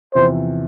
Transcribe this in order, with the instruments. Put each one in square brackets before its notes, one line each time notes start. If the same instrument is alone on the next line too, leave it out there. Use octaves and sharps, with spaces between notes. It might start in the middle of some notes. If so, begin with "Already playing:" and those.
[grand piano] E2 C3 F3 [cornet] C5